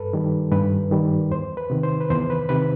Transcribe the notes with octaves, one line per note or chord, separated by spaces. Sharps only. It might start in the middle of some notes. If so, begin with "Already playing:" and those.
Already playing: G2 A4 B4
D#3 G3
G2 B4
D#3 G3
E2 C5
B4
C3 D#3
C5
B4
E2 C5
B4
C3 D#3 B4